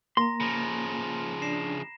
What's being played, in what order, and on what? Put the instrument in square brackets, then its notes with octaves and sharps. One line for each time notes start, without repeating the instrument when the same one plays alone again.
[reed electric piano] A#3 [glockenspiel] A#5 A#6 [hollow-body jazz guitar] C6
[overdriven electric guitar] C#3 F3 [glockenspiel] B5 A#6 D7
[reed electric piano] D4 [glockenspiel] A#6 C7 E7